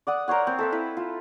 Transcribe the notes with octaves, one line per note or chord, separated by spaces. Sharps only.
D5 F#5 D#6
A#4 C5 C#5 F#5
C4
A4 E5 F5
E4 B4
F4